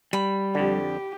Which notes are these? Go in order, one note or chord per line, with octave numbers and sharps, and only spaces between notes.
G3 B5
F2 D3 G4